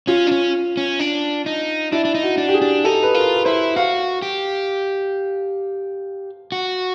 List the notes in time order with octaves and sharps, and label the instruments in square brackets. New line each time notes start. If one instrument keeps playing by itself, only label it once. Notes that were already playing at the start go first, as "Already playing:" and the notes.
[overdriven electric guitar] C#4 [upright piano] F4
[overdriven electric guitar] D4
C#4
C#4
D4
D#4
[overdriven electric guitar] D4 [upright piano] E4
[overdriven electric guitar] D4
D#4
[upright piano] F#4
[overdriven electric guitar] D4
[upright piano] G4
G#4
[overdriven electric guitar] D4
[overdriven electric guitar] D#4 [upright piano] A4
[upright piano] B4
[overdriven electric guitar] F4 [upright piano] A#4
[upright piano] B4
[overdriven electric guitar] E4 [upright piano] C5
[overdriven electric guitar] F#4 [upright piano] F5
[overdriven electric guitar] G4
F#4